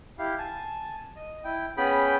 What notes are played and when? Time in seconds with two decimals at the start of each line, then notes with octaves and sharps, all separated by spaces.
0.19 E4 G4 F5
0.38 G#5 A5
1.16 D#5
1.44 E4 G5
1.77 B3 C#4 G#4 G5 B5